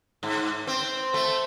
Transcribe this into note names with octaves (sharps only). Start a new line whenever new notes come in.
G#2
C4
A3